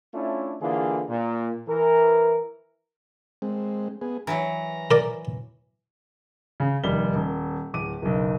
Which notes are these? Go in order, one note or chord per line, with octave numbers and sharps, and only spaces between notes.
A3 C#4 D4 E4 F4
D3 E3 A#3 F4 G#4
A#2
E3 A#4
G#3 C4
B3 G#4
E3 F#3 A#5
A#4 D5
C#3
F1 D#2 G3 G7
D#1
D1 D6 D#7
F#1 B1